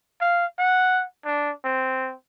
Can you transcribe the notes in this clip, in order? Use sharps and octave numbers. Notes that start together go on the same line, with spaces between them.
F5
F#5
D4
C4